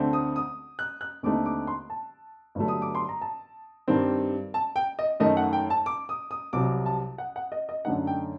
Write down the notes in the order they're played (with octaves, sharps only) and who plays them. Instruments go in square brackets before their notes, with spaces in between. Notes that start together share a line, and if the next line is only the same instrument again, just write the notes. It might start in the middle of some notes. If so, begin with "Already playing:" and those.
Already playing: [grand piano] D2 D3 A3 C4
D#6
D#6
F#6
F#6
D#2 D3 A3 C4 D#4 D6
D6
C6
A5
G1 G2 D3 F#3 A3
D#6
D6
C6
A#5
A5
G2 D#3 G3 C4
A5
G5
D#5
F#2 D#3 A3 D#4 D#5
F#5
G5
A5
D6
D#6
D#6
C2 C3 F#3 D6
A5
F#5
F#5
D#5
D#5
F#2 D3 A3 D#4 F#5
G5